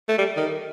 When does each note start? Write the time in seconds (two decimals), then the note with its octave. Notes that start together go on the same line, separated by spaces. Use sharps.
0.09 A3
0.18 G3
0.37 D#3